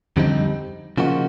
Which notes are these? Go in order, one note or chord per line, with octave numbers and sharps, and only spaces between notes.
F2 D3 G3 C4 D#4
C#3 F3 A#3 D#4 F#4